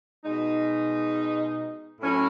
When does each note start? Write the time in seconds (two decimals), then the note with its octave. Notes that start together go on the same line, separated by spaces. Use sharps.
0.24 B2 G#3 D#4
2.00 A2 F#3 C#4 E4